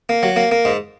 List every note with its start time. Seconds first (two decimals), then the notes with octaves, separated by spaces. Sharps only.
0.09 A#3
0.23 F#3
0.36 A#3
0.51 A#3
0.65 G#2